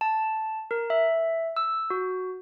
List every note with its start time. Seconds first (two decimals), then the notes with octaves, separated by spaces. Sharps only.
0.01 A5
0.71 A#4
0.90 E5
1.57 E6
1.90 F#4